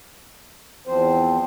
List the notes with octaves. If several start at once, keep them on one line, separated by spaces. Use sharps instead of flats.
E2 F3 C4 C5